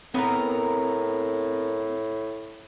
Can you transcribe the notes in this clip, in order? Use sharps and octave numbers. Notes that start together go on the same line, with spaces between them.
A2 B3 C4 A#4 A#5